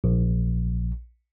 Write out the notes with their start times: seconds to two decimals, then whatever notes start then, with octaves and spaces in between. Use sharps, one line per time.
0.04 A#1